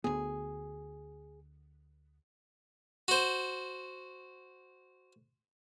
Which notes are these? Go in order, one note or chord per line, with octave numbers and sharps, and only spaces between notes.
D2 B3 G#4
F#4 C5